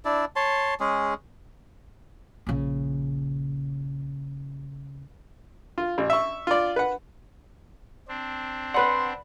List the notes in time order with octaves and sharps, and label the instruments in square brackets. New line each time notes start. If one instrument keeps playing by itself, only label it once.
[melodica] D4 E4 D5
C#5 A5 C6
G#3 C#4 G#4
[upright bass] A#1 C#3
[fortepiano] F4
A1
E5 C#6
F4 D5
B4 F#5
[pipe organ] C4 D4
[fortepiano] B4 F#5 [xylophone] D5 B5 F#6 [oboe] C6